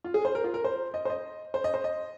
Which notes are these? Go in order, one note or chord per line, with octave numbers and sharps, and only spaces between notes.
F4
G#4
C5
A#4
F4
A#4
C5
D#5
C5
D#5
C5
D#5
C5
D#5